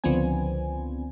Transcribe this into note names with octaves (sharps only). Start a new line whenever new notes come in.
C#2 D3 F3 B3 C4 G#5